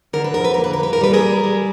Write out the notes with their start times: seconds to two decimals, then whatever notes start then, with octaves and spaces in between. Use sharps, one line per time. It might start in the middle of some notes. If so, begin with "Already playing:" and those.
0.13 D3 A#4
0.24 B4
0.34 F2 A#4
0.45 B4
0.54 A#3 A#4
0.64 B4
0.73 A#4
0.80 G3 B4
0.93 A#4
1.01 G3 B4
1.13 G#4 A#4
1.22 G3
1.44 G3